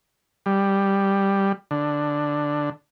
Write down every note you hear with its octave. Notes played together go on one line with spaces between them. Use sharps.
G3
D3